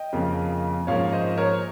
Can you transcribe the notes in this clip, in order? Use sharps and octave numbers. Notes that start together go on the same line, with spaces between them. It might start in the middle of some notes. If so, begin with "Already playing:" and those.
Already playing: D#5 G5
F2 C#3 F3 A#3
G#2 F3 A#3 C#4 C#5 F5
C5 D#5
A#4 C#5